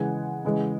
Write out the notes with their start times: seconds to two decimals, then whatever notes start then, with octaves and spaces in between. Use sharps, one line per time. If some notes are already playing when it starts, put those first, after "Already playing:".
Already playing: C#3 E3 G#3 F#5 G#5
0.45 C#3 E3 G#3